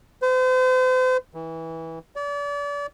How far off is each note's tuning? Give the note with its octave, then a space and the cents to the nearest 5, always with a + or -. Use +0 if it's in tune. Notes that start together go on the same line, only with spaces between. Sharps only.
C5 -40
E3 -20
D5 -35